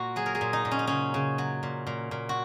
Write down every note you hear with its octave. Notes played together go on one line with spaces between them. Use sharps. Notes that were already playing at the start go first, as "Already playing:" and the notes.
Already playing: A#2 A#3 F#4
F#3 G#4
A#4
G#4
A#2
D#4
A#2
C#4
D#4
C#3 C#4
C#3
F#3
A#2
A#2
A#2
F#4